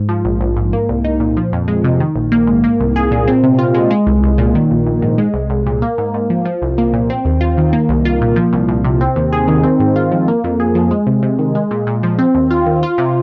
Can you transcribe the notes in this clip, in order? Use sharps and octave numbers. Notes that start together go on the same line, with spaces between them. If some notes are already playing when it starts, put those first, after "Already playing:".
Already playing: G#2
F3
A#1
A#1
G#2
A#3
C2
D#4
A#2
F3
F2
G#3
C3
D#3
A#1
A#3
G#2
A#3
C2
G#4
A#2
C4
C3
F4
G#3
G#3
C2
C2
A#2
D#3
A#1
A#1
G#2
G#3
C2
C2
A#2
A#3
G#2
G#2
F3
F3
C2
A#3
A#2
C4
D#2
F4
D#3
A#3
C2
F4
A#2
F3
C2
C2
C3
C4
D#2
G#4
D#3
C4
G#2
F4
F3
A#3
F2
G#4
F3
G#3
C3
C3
D#3
G#3
A#2
A#2
F3
C4
D#2
F4
D#3
F4
C3